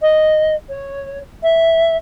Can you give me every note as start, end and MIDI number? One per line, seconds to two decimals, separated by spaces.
0.01 0.55 75
0.69 1.19 73
1.43 1.97 76